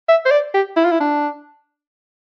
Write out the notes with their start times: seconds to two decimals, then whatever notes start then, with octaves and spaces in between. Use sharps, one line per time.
0.09 E5
0.25 C5
0.31 D5
0.54 G4
0.76 E4
0.84 F4
0.91 E4
1.00 D4